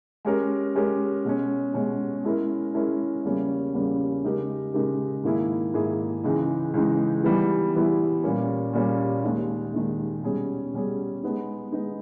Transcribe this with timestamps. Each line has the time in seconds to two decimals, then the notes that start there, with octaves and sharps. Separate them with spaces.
0.25 G#3 C#4 G4 A#4
0.75 G#3 C#4 G4 A#4
1.25 B2 G#3 C#4
1.74 B2 G#3 C#4
2.24 G#3 C#4 E4 A#4
2.74 G#3 C#4 E4 A#4
3.24 E2 C#3 G3 A#3 C#4
3.74 E2 C#3 G3 A#3 C#4
4.24 C#3 G#3 D#4 G4 A#4
4.74 C#3 G#3 D#4 G4 A#4
5.24 G#2 D#3 A#3 E4 G#4
5.74 G#2 D#3 A#3 E4 G#4
6.24 C#2 C#3 E3 G#3 D#4
6.74 C#2 C#3 E3 G#3 D#4
7.23 E3 G3 B3 E4
7.74 E3 G3 B3 E4
8.23 A#2 G3 A#3 C#4
8.73 A#2 G3 A#3 C#4
9.23 D#2 D#3 G#3
9.73 D#2 D#3 G#3
10.24 B2 G3 C#4 G#4
10.73 B2 G3 C#4 G#4
11.23 G#3 B3 D#4
11.72 G#3 B3 D#4